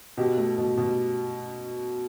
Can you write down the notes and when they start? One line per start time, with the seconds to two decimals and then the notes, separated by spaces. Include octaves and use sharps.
0.17 B2 G4
0.37 A3
0.58 B2
0.77 B2